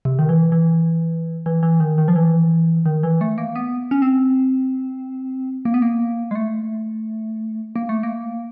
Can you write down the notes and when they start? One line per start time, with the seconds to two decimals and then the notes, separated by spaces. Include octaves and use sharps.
0.05 C3
0.19 D#3
0.29 E3
0.52 E3
1.46 E3
1.63 E3
1.80 D#3
1.98 D#3
2.08 F3
2.16 E3
2.86 D#3
3.03 E3
3.21 A3
3.38 A#3
3.56 B3
3.91 C#4
4.02 C4
5.65 A#3
5.74 B3
5.82 A#3
6.31 G#3
6.35 A3
7.76 A#3
7.89 A3
8.03 A#3